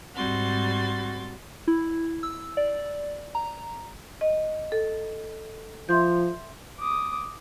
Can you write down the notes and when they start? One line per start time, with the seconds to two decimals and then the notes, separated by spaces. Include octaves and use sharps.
0.15 G#2 G3 C4 F#4 C6 A6
1.68 E4
2.23 E6
2.57 D5
3.35 A#5
4.21 D#5
4.72 A4
5.89 F3 E5 C6 G6
6.79 D6 D#6